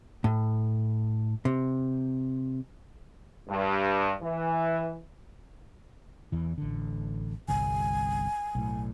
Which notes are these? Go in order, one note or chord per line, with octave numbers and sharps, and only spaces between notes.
A2
C3
G2
E3
E2 E3
A1 D3
G1 C2 G#5
B1 A2